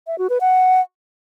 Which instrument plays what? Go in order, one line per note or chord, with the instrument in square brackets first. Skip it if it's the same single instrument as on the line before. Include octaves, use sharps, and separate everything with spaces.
[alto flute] E5
F#4
B4
F#5